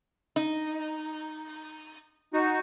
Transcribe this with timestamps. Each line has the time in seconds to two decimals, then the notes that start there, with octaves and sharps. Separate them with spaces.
0.36 D#4
2.34 D#4 F#4